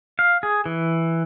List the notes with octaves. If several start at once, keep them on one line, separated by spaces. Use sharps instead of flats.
F5
G#4
E3